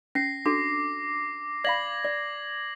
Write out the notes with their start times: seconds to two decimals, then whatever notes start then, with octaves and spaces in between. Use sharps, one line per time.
0.15 C#4 A#6 C7
0.46 D4 F#4 A4 D6
1.64 D5 F5 B5 G#6 A#6 F#7
2.05 D5